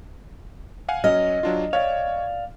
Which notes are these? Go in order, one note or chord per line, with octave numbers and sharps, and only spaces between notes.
F5 F#5 G#5
F#3 C#4 D#5 F6
F#3 D4 F4
C#5 D5 F5